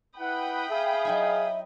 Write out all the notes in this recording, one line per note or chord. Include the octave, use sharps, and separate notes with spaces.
E4 B4 F#5 G5 B5 D#6
G#4 E5 F5
F#3 D#4 E4